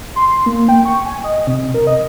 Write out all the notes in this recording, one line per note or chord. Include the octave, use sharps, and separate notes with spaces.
C6
A#3
G5
C#6
G#5
D#5
C3
A#4
D#5